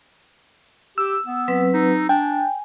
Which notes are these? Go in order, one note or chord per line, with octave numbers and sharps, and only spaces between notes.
G4 E6
B3
F#3 C4 B4
D#4
D4 G5 G#5